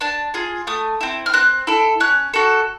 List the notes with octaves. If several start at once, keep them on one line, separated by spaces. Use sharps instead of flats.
D4 A5
F4 G#4
A3 D#6
C4 E4
F6
C4 F#6
E4 A4
C#4 F#6
F#4 A4